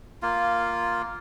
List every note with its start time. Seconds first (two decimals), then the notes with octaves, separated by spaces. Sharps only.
0.22 A#3 F4